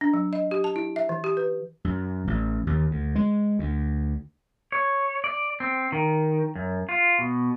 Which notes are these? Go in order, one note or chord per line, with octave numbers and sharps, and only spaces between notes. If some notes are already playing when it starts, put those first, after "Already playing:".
D4
F#3
D#5
G4
A5
E4
E5
E3
G4
B4
F#2
A1
D#2
D2
G#3
D2
C#5
D5
C4
D#3
F#2
F4
B2